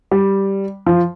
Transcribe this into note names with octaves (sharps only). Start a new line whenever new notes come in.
G3
F3